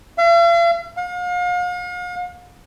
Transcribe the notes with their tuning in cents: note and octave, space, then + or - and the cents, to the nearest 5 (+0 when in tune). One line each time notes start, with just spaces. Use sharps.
F5 -45
F5 +40